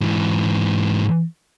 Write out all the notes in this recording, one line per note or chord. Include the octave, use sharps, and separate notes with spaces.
G#2 E3